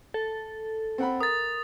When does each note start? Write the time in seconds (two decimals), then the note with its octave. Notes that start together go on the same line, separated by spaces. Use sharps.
0.14 A4
0.98 C4 F#5 B5
1.20 A#4 D#6 A6